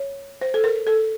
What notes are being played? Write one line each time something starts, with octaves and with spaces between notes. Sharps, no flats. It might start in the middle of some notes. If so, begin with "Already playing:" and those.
Already playing: C#5
C5
A4
A#4
A4